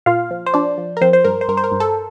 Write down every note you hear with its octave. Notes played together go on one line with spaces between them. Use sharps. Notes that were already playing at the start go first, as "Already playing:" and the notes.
A#2 F4 F5
F3
C5
F3 D4 D5
F3
A#4
F3 C4 C5
C5
G2 A#4
C5
G2 A#4
C5
A#4
G2
A4